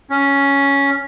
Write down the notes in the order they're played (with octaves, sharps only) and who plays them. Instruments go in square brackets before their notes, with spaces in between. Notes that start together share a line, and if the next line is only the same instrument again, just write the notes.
[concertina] C#4